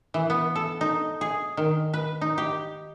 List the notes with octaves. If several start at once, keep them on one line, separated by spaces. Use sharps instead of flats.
E3
B3
A4
D#4
G#4
D#3
B4
D#4
G4